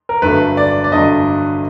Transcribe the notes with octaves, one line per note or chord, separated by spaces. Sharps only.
A#4
G1 G2 D3 F#3 A3 B4
D5
D5
G1 G2 D3 F#3 A3 D#5